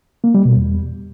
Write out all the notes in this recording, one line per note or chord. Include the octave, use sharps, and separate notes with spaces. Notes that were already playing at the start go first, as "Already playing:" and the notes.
A#3
G3
B2
E2